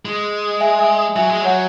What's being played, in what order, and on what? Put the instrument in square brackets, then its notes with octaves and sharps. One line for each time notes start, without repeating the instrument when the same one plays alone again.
[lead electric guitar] G#3
[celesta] E5 G#5
E5 G#5
[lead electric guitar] F#3 [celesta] E5 G#5
[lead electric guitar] G#3
[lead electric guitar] F#3 [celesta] C#5 F#5